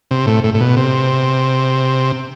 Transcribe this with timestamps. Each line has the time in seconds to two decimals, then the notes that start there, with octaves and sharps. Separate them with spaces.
0.11 C3
0.27 A2
0.44 A2
0.54 A2
0.60 B2
0.77 C3